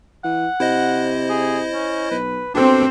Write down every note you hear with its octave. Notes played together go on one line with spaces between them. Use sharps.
E3 F#5
C3 E4 C5 D#5
G#4
C#4
B1 B4
B2 C4 D4 G4 A4